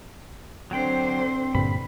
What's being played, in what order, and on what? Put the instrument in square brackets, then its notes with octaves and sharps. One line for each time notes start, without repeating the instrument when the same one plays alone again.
[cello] D3 C5 [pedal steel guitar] F#3 G5 [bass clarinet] C4
[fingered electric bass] G2 A#2 D3 [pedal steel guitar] B5